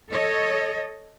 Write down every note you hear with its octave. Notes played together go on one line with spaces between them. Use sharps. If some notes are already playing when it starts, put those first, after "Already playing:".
A4 C#5 D#5